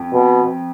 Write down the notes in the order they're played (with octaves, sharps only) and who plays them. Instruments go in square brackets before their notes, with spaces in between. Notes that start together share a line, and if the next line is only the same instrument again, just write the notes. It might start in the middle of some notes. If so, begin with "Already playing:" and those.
Already playing: [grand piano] F2
[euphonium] B2